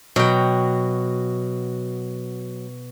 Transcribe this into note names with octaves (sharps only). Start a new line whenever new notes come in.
B2 F#3 G5